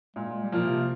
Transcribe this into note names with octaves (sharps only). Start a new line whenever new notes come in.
A#2 G#3
G3
A#2 F3 A#3 F4
C3